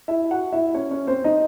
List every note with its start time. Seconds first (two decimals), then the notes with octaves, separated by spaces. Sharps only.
0.08 E4 E5
0.31 F#4 F#5
0.53 E4 E5
0.74 C#4 C#5
0.91 C#4 C#5
1.07 C4 C5
1.24 D#4 D#5